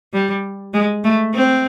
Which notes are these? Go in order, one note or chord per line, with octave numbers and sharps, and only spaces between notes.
G3
G#3
A3
C4